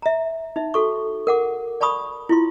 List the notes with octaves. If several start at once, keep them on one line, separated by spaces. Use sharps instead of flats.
E5 A#5
D#4 E5
F#4 A4 C#6
A#4 F#5 D6
D5 A5 B5 C#6 D#6
E4 F4 C6